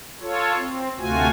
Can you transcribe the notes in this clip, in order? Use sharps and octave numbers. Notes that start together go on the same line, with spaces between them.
F4 A4 C#5
C4
D2 C3 A3 F4 F#4 G#5